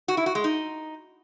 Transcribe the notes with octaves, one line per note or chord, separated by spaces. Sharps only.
F#4
E4
F#4
G#3
D#4